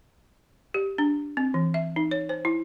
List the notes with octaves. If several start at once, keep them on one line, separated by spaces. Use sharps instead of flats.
G4
D4
C4
E3
E5
D#4
C#5
C5
E4